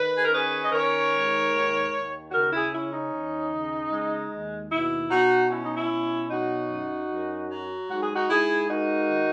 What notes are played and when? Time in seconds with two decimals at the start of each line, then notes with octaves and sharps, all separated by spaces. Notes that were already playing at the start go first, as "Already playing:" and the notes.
Already playing: D#3 B4
0.16 G#4
0.25 A#4
0.32 C#4 G#4 B4
0.62 D#5
0.72 D#3 A#4 C#5
1.12 G#2
1.52 D#2
1.92 D#2
2.31 C#3 F#4 A#4
2.52 E4 G#4
2.71 C#4 E4
2.91 D#4
3.12 D#2
3.51 C#3
3.91 G#3
4.31 D#2
4.71 B2 E4
5.10 B2 D#4 F#4
5.50 C#4 E4
5.63 D#4
5.74 E4
5.90 B2
6.30 F#3 D#4 F#4
6.70 F#2
7.11 F#2
7.50 F#3
7.90 G#2 F#4
8.01 G#4
8.12 D#4 F#4
8.29 G#2 E4 G#4
8.69 A#3 D#4 F#4
9.10 D#3